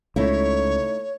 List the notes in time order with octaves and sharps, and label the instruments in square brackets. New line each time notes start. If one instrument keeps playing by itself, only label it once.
[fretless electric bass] C#2 [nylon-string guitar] A3 D#4 E4 [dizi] C#5